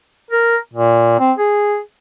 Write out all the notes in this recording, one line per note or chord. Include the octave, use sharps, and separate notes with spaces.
A#4
A#2
C4
G#4